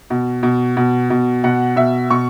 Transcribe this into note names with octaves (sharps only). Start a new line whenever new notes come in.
B2
B2
B2
B2
B2 F#5
B2 E5
B2 C#6